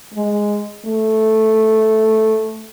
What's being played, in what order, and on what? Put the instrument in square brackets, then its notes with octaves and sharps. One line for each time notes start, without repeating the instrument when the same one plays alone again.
[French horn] G#3
A3